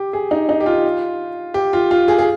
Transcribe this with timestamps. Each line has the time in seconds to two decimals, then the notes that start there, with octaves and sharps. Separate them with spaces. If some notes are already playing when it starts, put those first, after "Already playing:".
Already playing: G4
0.13 G#4
0.31 D#4
0.49 D#4
0.60 G4
0.66 F4
1.54 G4
1.73 F4
1.91 F4
2.08 G#4
2.19 G#4